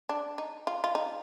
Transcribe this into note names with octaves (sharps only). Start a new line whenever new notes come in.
D4
D#4
F4
F4
D#4